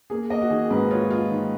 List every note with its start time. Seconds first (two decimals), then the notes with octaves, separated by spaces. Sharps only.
0.10 A#3 G#4
0.30 A#3 D#5
0.42 F#4
0.50 D#3 G#4
0.70 G#2 B4
0.91 F4 C#5
1.11 F4
1.31 D#3